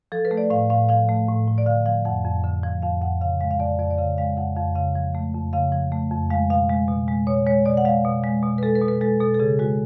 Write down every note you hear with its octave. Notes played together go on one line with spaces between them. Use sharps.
F3 A4
B4
A3
D5
A2 F5
A2 F5
F3 F5
A3
A2
A2
D5
D3 F5
F3 F5
F2 F#5
F2
D3
F3
F2 F5
F2 F#5
C#3 F5
G#3 F5
F5
F2 D5
F2 D5
D5
C#3 F5
G#3 F5
F2 F#5
F2 F5
C#3 F5
F3
A3
F2
C#3 F5
F3
A3
F2
G#3 F5
B2 F5
G#3
B2
G#3
B2 C#5
G#3 C#5
B2 D5
F#5
G#3 F5
B2
G#3
B2
B4
G#3 A4
B4
B2
B4
G#3 A4
B2 A4
A4
C#3 G#4
G#3 F#4